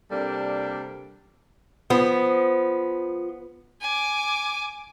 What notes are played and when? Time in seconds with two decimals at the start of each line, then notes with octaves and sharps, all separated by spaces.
0.11 C3 G3 A#3 D4 A4
1.90 F3 B3
3.81 G#5 D6